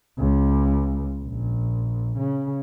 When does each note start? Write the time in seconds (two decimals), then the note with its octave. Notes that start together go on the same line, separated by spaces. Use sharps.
0.19 C#2
1.24 A#1
2.18 C#3